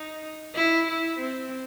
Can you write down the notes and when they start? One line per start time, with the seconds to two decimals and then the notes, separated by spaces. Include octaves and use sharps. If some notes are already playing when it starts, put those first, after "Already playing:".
Already playing: D#4
0.55 E4
0.87 E4
1.19 C4